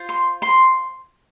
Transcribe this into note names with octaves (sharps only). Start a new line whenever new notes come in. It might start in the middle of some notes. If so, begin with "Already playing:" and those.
Already playing: F4 C5
C6
C6